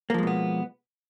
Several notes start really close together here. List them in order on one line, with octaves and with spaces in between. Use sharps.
A#3 F3 G#3 B2 B3